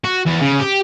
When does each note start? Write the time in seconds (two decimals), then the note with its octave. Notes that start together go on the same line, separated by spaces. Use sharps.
0.04 F#4
0.26 E2
0.41 C#3
0.59 G4